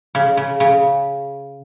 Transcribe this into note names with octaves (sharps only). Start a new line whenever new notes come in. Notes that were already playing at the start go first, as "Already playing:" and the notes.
C#3
C#3
C#3